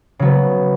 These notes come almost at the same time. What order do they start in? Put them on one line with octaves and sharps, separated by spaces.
C#3 F#3 B3